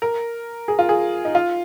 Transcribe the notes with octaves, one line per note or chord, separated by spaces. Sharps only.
A#4
G#4
F4
G#4
D#4
F4